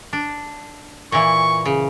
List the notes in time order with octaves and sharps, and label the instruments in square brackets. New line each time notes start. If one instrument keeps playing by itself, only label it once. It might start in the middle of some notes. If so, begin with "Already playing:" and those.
[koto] D4
[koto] A#2 E3 [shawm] C#6
[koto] C#3